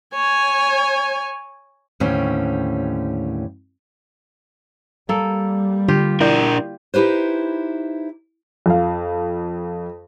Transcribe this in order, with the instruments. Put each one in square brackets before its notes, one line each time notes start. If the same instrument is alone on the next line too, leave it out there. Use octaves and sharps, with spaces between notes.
[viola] C#5 G#5
[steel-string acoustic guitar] D#2 A2 D3 G3 C4 C#4
[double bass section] G3 [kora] A#3 A4
[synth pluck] D3 [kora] F4 G4
[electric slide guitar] D4 A#4 [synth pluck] E4 D5 G6
[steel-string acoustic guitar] D#4 E4 G4 B4 C5
[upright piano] F2 F5